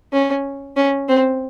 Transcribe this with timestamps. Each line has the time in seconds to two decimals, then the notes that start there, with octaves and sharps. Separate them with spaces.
0.13 C#4
0.76 C#4
1.09 C4